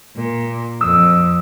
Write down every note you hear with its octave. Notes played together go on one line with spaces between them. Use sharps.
A#2
F2 D#6 E6